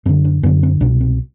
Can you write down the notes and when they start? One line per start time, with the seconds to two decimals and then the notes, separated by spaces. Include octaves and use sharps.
0.06 F#2 C4
0.09 D3
0.24 D4
0.43 F#2 D3 B3
0.63 C4
0.81 C2 B2 D4
1.00 C4